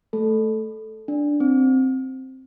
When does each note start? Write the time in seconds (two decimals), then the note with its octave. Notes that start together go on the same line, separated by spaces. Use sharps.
0.13 A3 A4
1.08 D4
1.40 C4